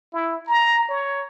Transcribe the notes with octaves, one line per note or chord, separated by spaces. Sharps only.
E4
A#5
C#5